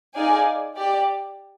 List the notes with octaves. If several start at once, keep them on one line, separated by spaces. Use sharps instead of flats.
D#4 G#4 D5 F5 G#5
G4 D5 G5